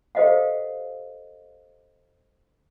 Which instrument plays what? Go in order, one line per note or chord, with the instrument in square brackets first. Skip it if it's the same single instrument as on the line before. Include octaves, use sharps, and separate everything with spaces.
[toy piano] G4 A4 C5 D#5 F5 F#5